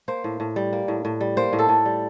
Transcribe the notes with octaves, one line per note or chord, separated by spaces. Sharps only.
A#3 C5
A2
A2
G3
A#3
A2
A2
G3
A#3 C5
A2
A4
A2
G3